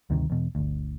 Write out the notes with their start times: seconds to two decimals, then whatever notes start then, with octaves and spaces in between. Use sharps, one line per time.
0.10 D2 G2 C3 D#3
0.30 E2 B2
0.55 G1 D2